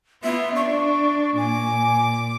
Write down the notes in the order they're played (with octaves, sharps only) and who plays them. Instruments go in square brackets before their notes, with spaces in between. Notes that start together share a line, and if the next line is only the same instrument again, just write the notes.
[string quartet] B3 F4 [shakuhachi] E5
[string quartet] D4 [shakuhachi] C#6
[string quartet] A#2 D6 [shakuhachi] G#5